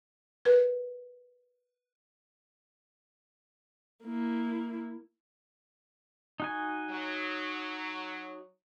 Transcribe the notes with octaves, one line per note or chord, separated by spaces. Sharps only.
A#4 B4
A#3 E4
D#4 F#4 G#5
F#3